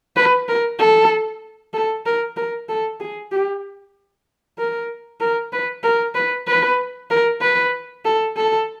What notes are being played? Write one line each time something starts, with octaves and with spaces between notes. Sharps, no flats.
B4
A#4
A4
A4
A#4
A#4
A4
G#4
G4
A#4
A#4
B4
A#4
B4
B4
A#4
B4
A4
A4